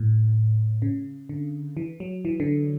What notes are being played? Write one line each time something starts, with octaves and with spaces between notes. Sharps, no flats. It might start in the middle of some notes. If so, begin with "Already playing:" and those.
Already playing: A2
C#3
D3
E3
F#3
E3
D3